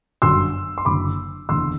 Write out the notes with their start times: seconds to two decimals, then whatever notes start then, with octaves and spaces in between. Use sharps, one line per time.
0.22 G1 F#2 D3 C6 E6
0.78 C6
0.85 F#1 F#2 D3 B5 D6
1.49 F#1 E2 D3 C6 E6